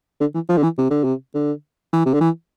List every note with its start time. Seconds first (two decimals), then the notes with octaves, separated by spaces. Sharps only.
0.20 D3
0.34 E3
0.49 F3
0.57 D3
0.63 E3
0.78 C3
0.90 D3
1.04 C3
1.34 D3
1.93 E3
2.05 C3
2.13 D3
2.21 E3